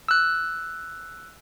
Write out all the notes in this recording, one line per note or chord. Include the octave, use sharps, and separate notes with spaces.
E6 F#6